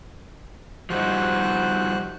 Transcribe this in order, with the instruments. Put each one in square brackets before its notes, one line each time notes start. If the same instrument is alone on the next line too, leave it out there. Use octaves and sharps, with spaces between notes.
[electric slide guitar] F3 G3 D#4 [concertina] F#4 C5 F#6